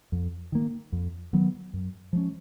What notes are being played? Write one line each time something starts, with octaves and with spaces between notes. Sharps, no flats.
F2
D#3 A#3
F2
D#3 F#3 B3
F#2
F3 G#3 C#4